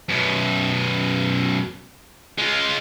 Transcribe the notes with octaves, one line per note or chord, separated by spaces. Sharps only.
F#2 B2
G#3 F4